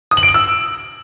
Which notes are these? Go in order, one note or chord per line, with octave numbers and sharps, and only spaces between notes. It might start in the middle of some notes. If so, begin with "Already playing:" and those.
D#6
F#7
D7
F#7
E6